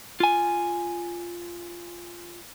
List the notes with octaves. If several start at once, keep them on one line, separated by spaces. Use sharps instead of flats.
F4 G#5